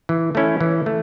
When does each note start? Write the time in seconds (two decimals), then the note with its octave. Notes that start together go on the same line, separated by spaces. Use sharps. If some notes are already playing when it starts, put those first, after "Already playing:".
0.09 E3
0.35 A3 C#4 E4
0.61 E3
0.86 A3